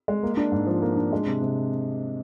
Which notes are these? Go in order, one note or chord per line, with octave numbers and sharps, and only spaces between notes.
G#3
A#3
D4
G#2
F3
A#3
D4
G#3
C3
C3